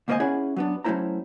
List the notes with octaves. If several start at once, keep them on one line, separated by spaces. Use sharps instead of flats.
D2 G#2 A#3 C5 D#5 G#5
C#4 E4 G#4 D5 F#5 G#5
F#3 B3 D4
F#3 A3 C#4 E4 C5 A#5